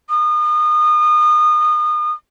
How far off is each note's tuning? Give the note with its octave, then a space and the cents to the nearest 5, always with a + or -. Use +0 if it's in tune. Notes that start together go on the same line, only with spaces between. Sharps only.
D#6 -30